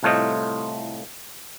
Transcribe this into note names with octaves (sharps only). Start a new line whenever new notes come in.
C2 A2 A3 F4 C5 D#5